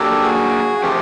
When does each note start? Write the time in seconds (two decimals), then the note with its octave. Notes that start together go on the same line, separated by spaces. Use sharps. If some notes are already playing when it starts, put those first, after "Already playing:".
Already playing: F#3 A#3 D4 G4 A4
0.23 F#4 G#4
0.78 F#4
0.83 F3 A3 C4 F4 G4 A#4